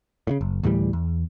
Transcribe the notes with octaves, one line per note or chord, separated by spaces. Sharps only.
A2 C#3
F#1
D2 A2 E3 G3
E2